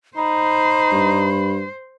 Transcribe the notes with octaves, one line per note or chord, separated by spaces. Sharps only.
D#4 C5 B5
G2